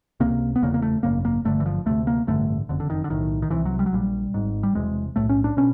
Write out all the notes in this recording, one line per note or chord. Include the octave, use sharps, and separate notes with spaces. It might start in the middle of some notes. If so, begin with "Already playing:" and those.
C#2 C3 A#3
B3
F1 E2 C#3 A#3
A#3
A3
G#1 F#2 C#3 A#3
A#3
G1 G2 D3 A3
E3
F3
D2 C3 A3
A#3
A1 G2 D3 A3
F#1 F2 D3
D3
D#3
D3
B1 A2 D#3
D#3
C2 C3 E3
F#3
G3
F#3
A#1 A#2 G3
G#1 G#2
G3
E1 E2 C3 G#3
B1 A2 A3
C#4
D4
B2 C#4